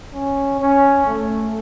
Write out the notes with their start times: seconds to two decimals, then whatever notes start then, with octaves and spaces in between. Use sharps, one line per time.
0.13 C#4
0.60 C#4
1.07 A3